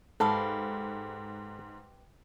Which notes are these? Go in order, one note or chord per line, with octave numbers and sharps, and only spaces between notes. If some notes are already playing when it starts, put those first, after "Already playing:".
G#2 G4 A4 B4 F5